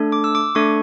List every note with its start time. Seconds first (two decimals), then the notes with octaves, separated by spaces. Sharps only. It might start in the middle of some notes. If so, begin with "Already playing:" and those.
Already playing: A3 D4 A4
0.12 D6
0.24 E6
0.35 D6
0.55 A3 D4 A4 C#6